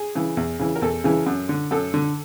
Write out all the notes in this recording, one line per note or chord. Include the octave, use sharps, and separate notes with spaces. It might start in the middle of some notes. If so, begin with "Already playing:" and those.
Already playing: G#4
C#3 E3
E2
C#3 E3
A#4
E2 A4
C#3 E3
F#2
D3
F#2 A4
D3